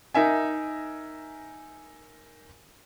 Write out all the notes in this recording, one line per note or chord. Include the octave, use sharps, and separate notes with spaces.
D#4 A#4 E5 G#5